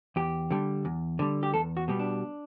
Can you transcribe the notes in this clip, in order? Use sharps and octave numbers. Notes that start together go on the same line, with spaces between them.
E2 G4
D3 G3
E2
D3 G3
G4
E2 A4
F#4
B2 G3 B3
D4